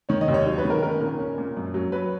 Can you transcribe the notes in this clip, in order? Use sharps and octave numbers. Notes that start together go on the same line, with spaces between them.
D#3 C#5
D#5
D#2
C#5
F#3 C#5
B4
D#3
A#4
C#4 A#4
A#2 A#4
C#4
A#2
F#2
F#3
F#3 B4